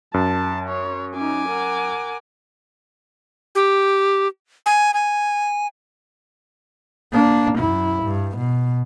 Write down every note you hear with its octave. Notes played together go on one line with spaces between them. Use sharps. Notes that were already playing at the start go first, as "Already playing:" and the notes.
F#2 A5
C#5
C#4 D#4 G#5 D6
A#4 F#5
G4
G#5
G#5
A#3 D4
F#2 E4
G2
B2